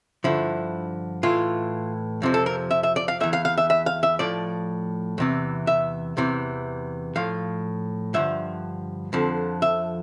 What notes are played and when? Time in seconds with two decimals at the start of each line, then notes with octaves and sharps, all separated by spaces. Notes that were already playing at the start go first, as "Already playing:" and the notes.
0.24 G2 D3 F3 E4
1.23 A2 E3 F4
2.22 F2 C3 F3
2.34 A4
2.46 A#4
2.71 E5
2.83 E5
2.96 D5
3.08 F5
3.20 E2 E3 E5
3.33 F5
3.45 F5
3.58 E5
3.70 E5
3.86 F5
4.03 E5
4.19 A2 F3 D5
5.18 E2 C3 E3
5.67 E5
6.17 E2 C3 E3
7.15 A2 F3 F5
8.14 G2 D3 F3 E5
9.13 F2 D3 F3
9.62 E5